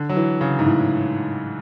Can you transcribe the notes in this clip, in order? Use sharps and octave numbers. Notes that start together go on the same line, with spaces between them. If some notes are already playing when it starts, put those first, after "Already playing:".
Already playing: D3
F#3
E3
C#3
G#2
A2